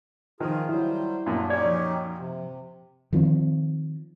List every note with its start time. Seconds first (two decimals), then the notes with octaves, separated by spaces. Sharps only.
0.40 D#3 F3 F4 G#4 A#4
0.69 F#3 G3 E4 C5
1.26 F#2 A#2 D4
1.50 C#4 D#4 G4 D5 G#6
1.66 F3
2.17 C3
3.13 D#3 F3 A#3 C4